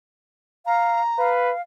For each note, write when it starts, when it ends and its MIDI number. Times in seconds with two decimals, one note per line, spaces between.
0.66 1.01 77
0.66 1.29 82
1.18 1.52 71
1.18 1.61 77